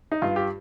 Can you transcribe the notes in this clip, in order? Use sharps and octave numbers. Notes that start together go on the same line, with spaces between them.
D#4
G2 F4
G4